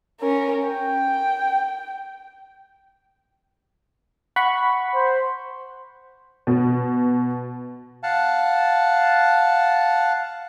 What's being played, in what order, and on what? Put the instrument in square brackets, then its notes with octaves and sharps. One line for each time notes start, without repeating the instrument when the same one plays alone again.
[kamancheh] C#4 A#4
G5
[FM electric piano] F#5 B5 C#6
[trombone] C5
[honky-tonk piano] B2
[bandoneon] F5 F#5 A5